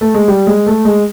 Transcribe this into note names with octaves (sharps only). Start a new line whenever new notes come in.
A3
G#3
G3
G#3
A3
G#3